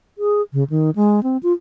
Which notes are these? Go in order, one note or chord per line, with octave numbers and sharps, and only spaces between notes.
G#4
C#3
D#3
G#3
C4
F4